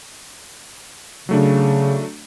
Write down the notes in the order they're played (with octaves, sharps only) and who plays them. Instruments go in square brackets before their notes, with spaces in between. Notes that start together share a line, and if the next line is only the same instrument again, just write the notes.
[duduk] C#3 [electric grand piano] F#3 A3 D4